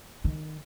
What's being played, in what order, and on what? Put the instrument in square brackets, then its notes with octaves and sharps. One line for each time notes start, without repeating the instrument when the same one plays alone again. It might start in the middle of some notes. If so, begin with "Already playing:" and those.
[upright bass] D#3